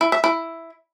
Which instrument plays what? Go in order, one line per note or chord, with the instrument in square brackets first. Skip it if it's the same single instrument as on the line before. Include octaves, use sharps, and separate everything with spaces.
[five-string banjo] E4
E5
E4